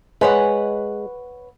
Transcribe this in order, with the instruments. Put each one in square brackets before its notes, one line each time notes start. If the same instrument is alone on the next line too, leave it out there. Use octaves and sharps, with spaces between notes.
[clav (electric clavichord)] G#3 [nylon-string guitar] B4 C#5 F#5